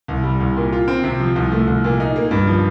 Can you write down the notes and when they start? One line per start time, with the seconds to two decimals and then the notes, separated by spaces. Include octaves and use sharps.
0.08 C2
0.24 G3
0.40 C2
0.57 A#2
0.73 F4
0.88 C4
1.04 C3
1.20 F3
1.36 C2
1.52 A3
1.67 C2
1.84 A#2
2.00 D#4
2.16 A#3
2.31 G2
2.47 F3